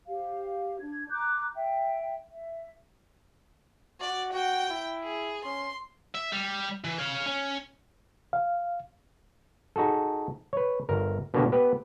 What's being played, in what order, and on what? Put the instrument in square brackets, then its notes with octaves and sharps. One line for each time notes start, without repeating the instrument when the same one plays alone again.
[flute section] G4 C5 F5
D4 G#6
A#5 D6 F#6 G6
E5 G5
E5
[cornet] F#4 [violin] D5
[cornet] F#4 [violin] G5
[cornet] E4
[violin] G#4
[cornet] C#4 [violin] C6
[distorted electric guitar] E5
G3
E3
C#5 F5
C#4
[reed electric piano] F5
[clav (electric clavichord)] D#4 F#4 G#4 A4
B4 C#5
G1 A#4
B2 D3 A#3 B3 D4 G4
B3 G4 B4